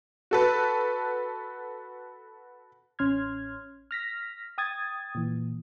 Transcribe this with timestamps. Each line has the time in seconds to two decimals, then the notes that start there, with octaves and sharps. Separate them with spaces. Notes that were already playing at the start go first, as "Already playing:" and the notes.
0.31 F#4 A4 B4
2.99 A1 C#4 C6 F6 G#6
3.91 F6 A#6 B6
4.58 G5 D#6 G#6 A6
5.15 A#2 E3